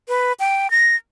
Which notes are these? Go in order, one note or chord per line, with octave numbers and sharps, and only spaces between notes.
B4
G5
A#6